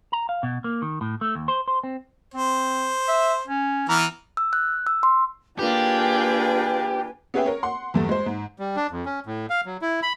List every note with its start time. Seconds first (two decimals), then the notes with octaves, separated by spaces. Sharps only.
0.12 A#5
0.29 F5
0.43 B2
0.64 A#3
0.82 D#3
1.01 A2
1.21 A3
1.35 D#2
1.48 C5
1.68 C5
1.84 C4
2.34 C4 C5
3.08 E5
3.47 C#4
3.89 E3 B3 A#5 F6
4.37 E6
4.53 F#6
4.87 E6
5.03 C6
5.59 A#3 D4 F4 G4 G#4 B4 G5 G#5
7.34 B3 C#4 G#4 B4 E5 G5
7.46 A#4 C#5
7.63 F#5 C6
7.94 E2 G2 A3
8.09 G#3 C5
8.26 G#2
8.59 G3
8.76 D4
8.91 F2
9.05 C#4
9.26 A2
9.50 F5
9.66 F#3
9.81 E4
10.02 B5